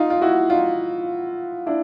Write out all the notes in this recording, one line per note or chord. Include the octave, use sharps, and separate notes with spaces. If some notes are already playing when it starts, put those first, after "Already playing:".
Already playing: D#4 F4
F4
E4 F#4
D#4 F4
D4 E4